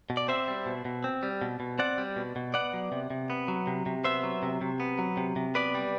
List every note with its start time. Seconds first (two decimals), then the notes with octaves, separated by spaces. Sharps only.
0.10 B2
0.17 D5
0.28 C4 C5 E5
0.48 G3
0.66 B2
0.85 B2
1.04 C4
1.23 G3
1.42 B2
1.60 B2
1.79 C4 D5 F#5
1.98 G3
2.16 B2
2.36 B2
2.54 B3 D5 F#5
2.73 F#3
2.92 C3
3.10 C3
3.30 B3
3.48 F#3
3.67 C3
3.86 C3
4.04 B3 C5 E5
4.23 F#3
4.43 C3
4.61 C3
4.80 B3
4.99 F#3
5.17 C3
5.36 C3
5.55 B3 B4 D5
5.75 G3